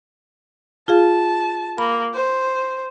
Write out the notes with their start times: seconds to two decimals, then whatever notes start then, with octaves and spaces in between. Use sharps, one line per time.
0.88 F4 G#4 F5 A5
1.78 A#3 B5
2.14 C5